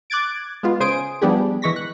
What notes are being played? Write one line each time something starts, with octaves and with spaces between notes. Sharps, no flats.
D6 F#6 G#6 A6 D7
G#3 B3 F4
C#3 C5 G#5 D#6 D7
F3 G3 B3 D4 G4 G#4
E3 G#3 C#6 A#6 B6
F#6